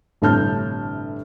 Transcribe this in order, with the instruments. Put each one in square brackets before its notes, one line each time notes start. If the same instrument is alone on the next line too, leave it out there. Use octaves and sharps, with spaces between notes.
[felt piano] G1 A2 C3 A5 F6 G6